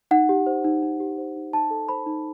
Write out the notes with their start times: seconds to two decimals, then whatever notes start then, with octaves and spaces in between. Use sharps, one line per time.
0.11 D#4 F#5
0.29 G4
0.46 C5
0.64 D#4
0.82 D#4
1.00 G4
1.18 C5
1.36 D#4
1.53 D#4 A5
1.71 A4
1.89 C5 B5
2.06 D#4